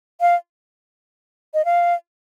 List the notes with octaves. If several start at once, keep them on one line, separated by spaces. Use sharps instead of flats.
F5
D#5
F5